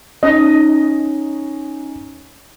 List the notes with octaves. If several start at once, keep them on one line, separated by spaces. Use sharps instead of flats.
C#4 D#4 D#5